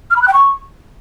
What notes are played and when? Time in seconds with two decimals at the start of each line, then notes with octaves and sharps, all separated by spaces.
0.11 F6
0.16 B5
0.22 F#6
0.28 G5
0.34 C#6